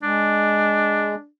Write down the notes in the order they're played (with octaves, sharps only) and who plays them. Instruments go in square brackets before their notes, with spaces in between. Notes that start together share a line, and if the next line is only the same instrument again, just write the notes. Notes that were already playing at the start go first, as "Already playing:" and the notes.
[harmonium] G#3 [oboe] D4